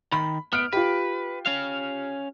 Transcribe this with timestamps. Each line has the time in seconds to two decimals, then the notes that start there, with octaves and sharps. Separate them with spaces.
0.12 D#3 B5
0.53 B3 F6 D7
0.73 F4 G4 B4
1.46 C#4 F5